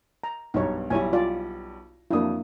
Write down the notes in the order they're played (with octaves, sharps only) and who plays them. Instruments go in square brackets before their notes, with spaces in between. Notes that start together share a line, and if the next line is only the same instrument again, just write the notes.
[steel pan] A#5
[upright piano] B1 G2 B2 [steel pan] D#4 C#5
[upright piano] B1 G3 [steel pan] E4 C#5 G#5
[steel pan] F4 D5
[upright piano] F2 F#3 D#6 [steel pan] A#3 D4 E4